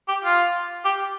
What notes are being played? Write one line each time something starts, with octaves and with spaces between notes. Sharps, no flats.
G4
F4
G4